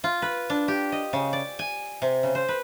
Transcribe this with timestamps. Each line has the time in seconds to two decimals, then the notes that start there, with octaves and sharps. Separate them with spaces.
0.04 F4
0.22 B4
0.50 D4
0.68 G4
0.92 D#5
1.13 C#3
1.33 D5
1.59 G#5
2.02 C3
2.23 C#3
2.35 C5
2.49 B4